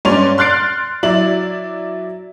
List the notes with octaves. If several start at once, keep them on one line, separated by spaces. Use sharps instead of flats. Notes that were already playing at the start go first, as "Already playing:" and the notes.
G2 C#4 D5 C6 F7
C6 F6 F#6 A6 C7 D7
F#3 E4 D5 F#7